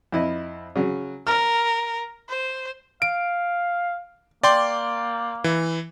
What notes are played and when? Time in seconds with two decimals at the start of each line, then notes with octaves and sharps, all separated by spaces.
0.12 F2 E4 D#5
0.76 C#3 F#3
1.27 A#4 F6
2.29 C5
3.02 F5 D7
4.43 A#3 D5 G5 C6
5.44 E3